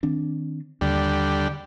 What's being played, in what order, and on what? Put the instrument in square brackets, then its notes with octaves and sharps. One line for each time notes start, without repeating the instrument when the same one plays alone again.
[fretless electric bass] D#3 C4 D4
[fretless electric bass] D#2 [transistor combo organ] D3 G3